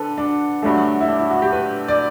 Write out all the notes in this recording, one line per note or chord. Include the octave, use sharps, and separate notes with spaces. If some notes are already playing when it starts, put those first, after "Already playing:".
Already playing: D3 A4 B4
D4
G2 D3 F#3 A3
E4
D4
E4
F#4
G4
B4
D5